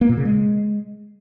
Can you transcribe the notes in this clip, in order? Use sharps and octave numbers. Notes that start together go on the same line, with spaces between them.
A#3
A#2
C#3
G#3